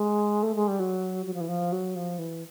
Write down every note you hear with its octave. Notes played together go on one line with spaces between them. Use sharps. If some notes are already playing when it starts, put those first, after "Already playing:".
Already playing: G#3
A3
G#3
G3
F#3
F#3
F3
E3
F3
F#3
F3
E3